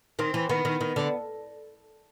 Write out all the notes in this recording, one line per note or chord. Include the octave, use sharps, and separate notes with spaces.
D#3 C4
E3
D#3 B3
D#3
D#3
D3